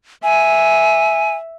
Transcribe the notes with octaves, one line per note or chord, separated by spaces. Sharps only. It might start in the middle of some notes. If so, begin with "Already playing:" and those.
E5 G#5